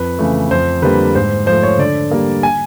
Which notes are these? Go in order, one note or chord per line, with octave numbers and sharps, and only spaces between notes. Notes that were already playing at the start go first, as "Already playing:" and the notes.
Already playing: F2 B4
C#3 E3 A3
F2 C5
D3 G3 A#3 B4
G#2 C5
F3 A3 C5
C#5
D3 D5
G3 A#3
G#5